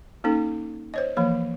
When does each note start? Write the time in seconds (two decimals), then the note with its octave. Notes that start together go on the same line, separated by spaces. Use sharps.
0.24 A#3 C#4 D#4 A4
0.94 C5 C#5 D#5
1.17 E3 F3 A#3 C#5